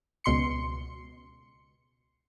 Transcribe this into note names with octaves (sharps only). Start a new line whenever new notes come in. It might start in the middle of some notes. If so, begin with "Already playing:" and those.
C#2 B2 C6 C#7